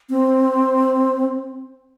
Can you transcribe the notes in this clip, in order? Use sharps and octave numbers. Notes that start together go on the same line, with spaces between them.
C4